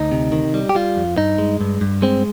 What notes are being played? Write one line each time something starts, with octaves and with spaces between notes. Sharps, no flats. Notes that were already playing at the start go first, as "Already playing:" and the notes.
Already playing: D2 D#4
C3
D#3
G3
G4
G3 F4
F2
G2 D#4
G#3
G2
G2
G#3 C4